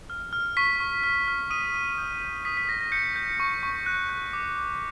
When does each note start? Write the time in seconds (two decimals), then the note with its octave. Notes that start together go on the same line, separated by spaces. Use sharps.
0.10 F6
0.33 F6
0.57 C#6 B6
0.80 C#6
1.04 F6
1.28 F6
1.50 D#6 D#7
1.74 D#6
1.98 G6
2.22 G6
2.45 D#6 B6
2.57 B6
2.69 D#6 A#6
2.81 A#6
2.92 G6 C#7
3.16 G6
3.40 C#6
3.63 C#6
3.86 F#6
4.09 F#6
4.33 D6
4.58 D6